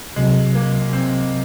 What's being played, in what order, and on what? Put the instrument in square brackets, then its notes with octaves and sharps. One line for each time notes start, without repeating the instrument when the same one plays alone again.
[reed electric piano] C2 C3 F#3 [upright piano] G#3
[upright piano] A#3
C4